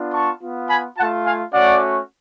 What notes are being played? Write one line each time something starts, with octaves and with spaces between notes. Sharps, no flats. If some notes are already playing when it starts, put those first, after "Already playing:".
Already playing: B3 D4 F4
A5 C#6
B3 F4
G#5 B5
A3 F4 F#5 A5
F5 G#5
A3 C#4 F#4 D5 F#5